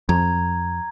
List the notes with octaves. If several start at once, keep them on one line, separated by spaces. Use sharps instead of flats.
F2 A#5 G#6